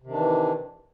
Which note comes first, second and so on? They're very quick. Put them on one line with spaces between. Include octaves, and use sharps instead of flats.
C3 D#3 D4 E3